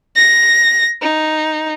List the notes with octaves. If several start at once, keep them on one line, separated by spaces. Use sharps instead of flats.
A#6
D#4